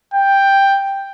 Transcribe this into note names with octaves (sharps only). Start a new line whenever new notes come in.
G5